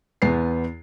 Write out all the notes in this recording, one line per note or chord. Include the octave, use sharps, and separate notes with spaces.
E2 B3 C7